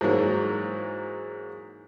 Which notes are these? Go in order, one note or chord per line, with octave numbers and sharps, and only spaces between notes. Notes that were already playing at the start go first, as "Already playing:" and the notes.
G#2 E3 F#3 A#3